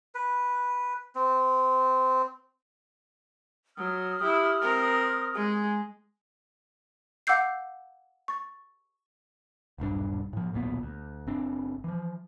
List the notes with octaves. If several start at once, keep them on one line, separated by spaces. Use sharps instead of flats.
B4
C4
F#3 D#6 F6
E4 G4
C4 A#4
G#3 G#4
F5 F#5 D6 E6 G6 C7
C#6 A6
D#1 B1 G2 D4
A2 F3
D#1 B1 A#2 B3
D2
F#1 C4 D4
E3 F3